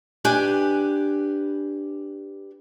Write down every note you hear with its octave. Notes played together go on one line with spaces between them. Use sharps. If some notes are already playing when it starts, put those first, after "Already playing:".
D4 G4 B4 G#5